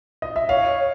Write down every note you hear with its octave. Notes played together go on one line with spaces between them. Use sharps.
D#5
E5
C#5 F5